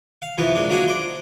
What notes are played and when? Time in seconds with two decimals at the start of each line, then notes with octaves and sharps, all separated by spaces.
0.22 F5
0.38 F2 C3 E3 B3
0.55 A#2 G#3 D4
0.69 F#3 A#3 D4 D#4 F#4 G#4
0.88 C5 D5